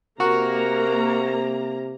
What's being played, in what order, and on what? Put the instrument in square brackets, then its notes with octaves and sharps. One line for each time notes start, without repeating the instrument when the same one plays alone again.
[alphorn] C3 [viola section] A#3 A#5 [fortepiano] F#4 [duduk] A#4